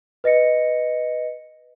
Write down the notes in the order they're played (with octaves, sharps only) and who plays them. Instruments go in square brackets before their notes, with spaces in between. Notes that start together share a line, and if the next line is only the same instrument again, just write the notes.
[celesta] B4 D#5 A#6 C#7